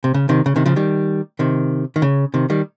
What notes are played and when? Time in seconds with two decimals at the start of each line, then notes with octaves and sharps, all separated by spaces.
0.04 C3
0.14 C#3
0.29 C3 D#3
0.46 C#3
0.56 C3 D#3
0.66 C#3 F3
0.76 D#3 G3
1.39 C3 D#3
1.96 D#3
2.02 C#3
2.34 C3 D#3
2.50 D#3 G3